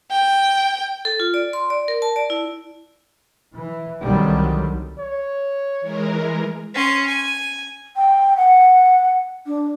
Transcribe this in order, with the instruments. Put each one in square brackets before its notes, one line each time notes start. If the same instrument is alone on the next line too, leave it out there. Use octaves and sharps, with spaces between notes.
[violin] G5
[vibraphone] A4
F4
D5
C6
D5
A#4
A5
D5
E4
[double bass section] E3
C2 D3 D#3 F#3 G3
[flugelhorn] C#5
[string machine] E3 G#3 A#4
[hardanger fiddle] C#4 C6
G#5
[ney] G5
F#5
D4